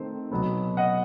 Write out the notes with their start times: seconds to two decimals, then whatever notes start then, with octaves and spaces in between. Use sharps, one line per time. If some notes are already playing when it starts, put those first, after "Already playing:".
Already playing: D#3 A3 C4
0.31 B2 F#3 B3
0.77 D#5 F#5